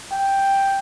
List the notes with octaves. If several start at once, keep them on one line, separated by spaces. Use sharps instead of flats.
G5